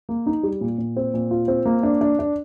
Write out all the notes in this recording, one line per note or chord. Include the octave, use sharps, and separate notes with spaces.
A#3
D#4
G3
A#2
A#2
C4
A#2
F4
C4
A#3
D4
D4
D4